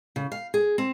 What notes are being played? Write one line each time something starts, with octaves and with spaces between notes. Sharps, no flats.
C#3
F5
G#4
C4